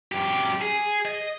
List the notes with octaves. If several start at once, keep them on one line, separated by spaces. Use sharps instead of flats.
F#2 G4
G#4
D#5